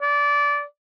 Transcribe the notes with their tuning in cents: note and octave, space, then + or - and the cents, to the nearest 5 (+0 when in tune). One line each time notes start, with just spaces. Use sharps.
D5 -20